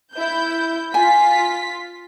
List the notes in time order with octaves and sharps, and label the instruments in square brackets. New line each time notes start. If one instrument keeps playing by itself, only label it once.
[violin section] E4 G6
[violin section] F4 B6 [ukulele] G#5